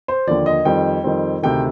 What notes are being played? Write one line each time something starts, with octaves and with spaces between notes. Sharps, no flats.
C5
D#2 D3 F3 D5
D#5
F2 D#3 G3 C4 G5
F2 D#3 G3 C4
D2 C3 D#3 G5